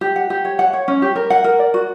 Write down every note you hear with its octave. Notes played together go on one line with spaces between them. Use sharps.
G4
F#5
G4
C#5
F#5
C#5
C#4
G4
A#4
F#5
A#4
D5
F#4